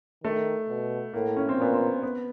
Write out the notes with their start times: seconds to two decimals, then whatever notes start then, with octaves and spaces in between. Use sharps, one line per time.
0.24 D#3 A3
0.68 B2
1.14 A2 A#3
1.37 C#4
1.49 C4
1.59 A#2 B3
1.74 C4
2.03 B3